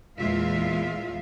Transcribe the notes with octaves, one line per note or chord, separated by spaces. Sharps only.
E2 A#2 G#3 F4 E5 F5